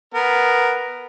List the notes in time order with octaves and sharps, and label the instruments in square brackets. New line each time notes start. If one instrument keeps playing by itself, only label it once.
[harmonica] B3 A#4